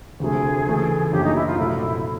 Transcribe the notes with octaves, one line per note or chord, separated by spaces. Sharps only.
D2 C3 F3 A3 G#4
C#3 E3 A3
F#2 D3 F3 A#3 G4
D#4
E4
F4
C2 A#2 F#3 A3 E4
E4
E4